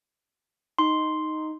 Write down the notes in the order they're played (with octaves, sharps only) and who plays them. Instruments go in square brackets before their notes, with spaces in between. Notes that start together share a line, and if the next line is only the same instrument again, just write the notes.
[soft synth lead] D#4 [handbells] C6